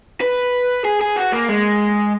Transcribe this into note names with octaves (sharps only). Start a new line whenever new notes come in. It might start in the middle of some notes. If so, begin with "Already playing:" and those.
B4
G#4
G#4
F#4
A#3
G#3